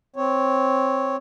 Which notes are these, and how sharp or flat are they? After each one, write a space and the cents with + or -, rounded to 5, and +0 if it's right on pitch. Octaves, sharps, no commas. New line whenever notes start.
C4 +0 C#5 +0